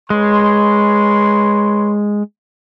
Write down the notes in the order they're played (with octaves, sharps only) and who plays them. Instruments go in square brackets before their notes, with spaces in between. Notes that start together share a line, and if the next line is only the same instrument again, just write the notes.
[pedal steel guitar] G#3 [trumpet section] B4 C#5 C6